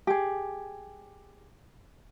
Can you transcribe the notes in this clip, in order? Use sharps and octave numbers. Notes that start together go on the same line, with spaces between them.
G4 G#4